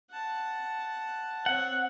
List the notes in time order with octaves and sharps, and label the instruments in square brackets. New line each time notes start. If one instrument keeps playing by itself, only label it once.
[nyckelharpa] F#5 A5
[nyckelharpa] C4 C#5 [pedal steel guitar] F#5